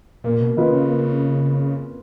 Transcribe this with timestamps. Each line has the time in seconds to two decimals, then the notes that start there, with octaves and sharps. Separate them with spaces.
0.24 A#2 A#3
0.40 B2
0.57 D#3 F4 B4 D#5
0.72 C#3
0.88 A#3